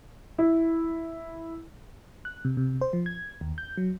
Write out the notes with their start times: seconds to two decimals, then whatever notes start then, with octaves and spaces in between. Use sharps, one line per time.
0.38 E4
2.25 F#6
2.45 C3
2.57 C3
2.81 C5
2.93 F3
3.06 G#6
3.41 D#2
3.58 G6
3.78 F#3